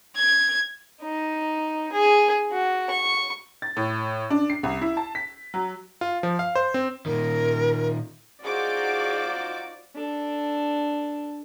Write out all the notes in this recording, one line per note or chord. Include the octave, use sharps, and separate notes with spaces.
G#6
D#4
G#4
F#4
C#6
A6
A2
D4
C7
C2
E4
A5
B6
F#3
F4
F3
F5
C5
C4
A#2 D#3 A#4
D#4 F4 F#4 G#4 C5 D5 D6
D4 A4